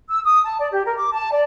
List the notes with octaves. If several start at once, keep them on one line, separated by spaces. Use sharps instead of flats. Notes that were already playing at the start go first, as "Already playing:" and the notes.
E6
D#6
A5
D5
G4
A#4
D6
A5
D5